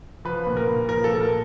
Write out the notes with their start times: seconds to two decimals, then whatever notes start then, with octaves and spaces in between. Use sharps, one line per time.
0.25 F3 B4
0.47 A#2
0.57 A#4
0.68 A#2
0.89 F3 A#4
1.04 A4
1.10 A#2
1.21 A#4